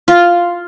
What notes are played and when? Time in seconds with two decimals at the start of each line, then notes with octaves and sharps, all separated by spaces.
0.08 F4